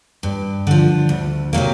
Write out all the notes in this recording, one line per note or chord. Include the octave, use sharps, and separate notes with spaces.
G2
D3 F3
D2
C3 D#3 F#3 A#3